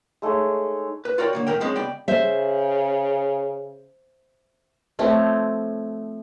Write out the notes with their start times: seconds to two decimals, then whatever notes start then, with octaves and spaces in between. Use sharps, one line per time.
0.22 G#3 A3 D#4 C#5
1.05 B4
1.18 F4 F#4 A#4 C#5 D5 G5
1.33 D3 A#3 C#5
1.47 E2 A3 A#4 G5
1.61 F3 G#3 C4 C#4 D#4
1.76 C#2 B3 D5 G5
2.08 C#3 C5 E5
4.99 F3 A3 C4 C#5